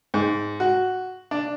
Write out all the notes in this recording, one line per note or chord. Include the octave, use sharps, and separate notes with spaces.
G#2
F#4
D4